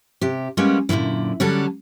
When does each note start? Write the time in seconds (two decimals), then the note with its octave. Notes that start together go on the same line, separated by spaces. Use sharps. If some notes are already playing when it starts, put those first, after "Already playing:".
0.21 C3 G4
0.57 G3 G#3 A#3 B3 C#4
0.89 F#2 A#2 D3 E3 E4
1.40 D3 F#3 G3 C#4 D4 A4